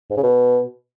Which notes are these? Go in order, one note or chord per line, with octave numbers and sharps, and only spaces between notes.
G#2
C#3
B2